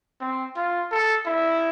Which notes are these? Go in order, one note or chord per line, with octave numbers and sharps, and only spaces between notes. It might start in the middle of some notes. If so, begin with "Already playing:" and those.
C4
F4
A4
E4